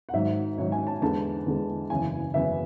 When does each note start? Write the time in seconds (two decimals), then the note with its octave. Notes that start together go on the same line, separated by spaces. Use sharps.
0.09 F#5
0.13 G#1 G#2 F#3 E5
0.57 G#1 G#2 F#3 C#5
0.72 G#5
0.87 A5
1.02 E2 D3 G#3 A5
1.46 E2 D3 G#3
1.90 F#1 E2 C#3 E3 G#5
2.34 F#1 E2 C#3 E3 E5